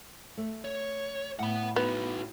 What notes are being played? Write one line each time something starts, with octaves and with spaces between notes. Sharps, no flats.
A3
C#5
A2 F#5 B5
B3 D#4 F#4